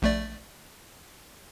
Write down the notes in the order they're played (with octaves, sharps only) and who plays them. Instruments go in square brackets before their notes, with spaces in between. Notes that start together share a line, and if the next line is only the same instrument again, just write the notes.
[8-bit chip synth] A#1 A3 D5